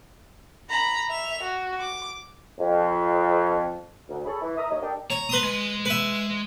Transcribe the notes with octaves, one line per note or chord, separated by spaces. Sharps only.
A#5 B5
E5 F7
F#4
D6
F2
D2
G#4 A4 C#5 B5
E3 E4
E5 A#5 D#6
D#2 C#5 D#5
D4 G4 A4 A#4 G5
C#5 A#5
B4 C6 D#6
G#3
B4 E5